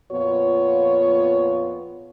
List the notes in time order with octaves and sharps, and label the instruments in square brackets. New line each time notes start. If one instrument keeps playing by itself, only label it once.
[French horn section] F2 A#2 B3 F4 C#5